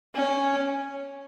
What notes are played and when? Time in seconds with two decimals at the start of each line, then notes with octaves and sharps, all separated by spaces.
0.15 C#4